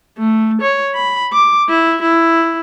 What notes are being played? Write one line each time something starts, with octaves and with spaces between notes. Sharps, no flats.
A3
C#5
B5
D6
E4
E4